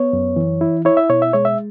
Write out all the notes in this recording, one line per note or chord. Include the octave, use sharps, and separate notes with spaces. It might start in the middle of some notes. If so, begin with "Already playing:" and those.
Already playing: B3 C#5
F#2
E3
E4
E4 C#5
E5
B2 C#5
E5
G#3 C#5
E5